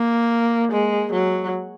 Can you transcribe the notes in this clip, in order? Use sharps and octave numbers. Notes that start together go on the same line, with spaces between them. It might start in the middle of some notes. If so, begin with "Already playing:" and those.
Already playing: A#3
G#3
F#3